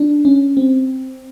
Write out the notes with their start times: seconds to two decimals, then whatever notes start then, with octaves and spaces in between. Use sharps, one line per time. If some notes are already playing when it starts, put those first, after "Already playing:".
Already playing: D4
0.25 C#4
0.57 C4